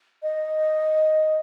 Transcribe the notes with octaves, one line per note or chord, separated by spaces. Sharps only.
D#5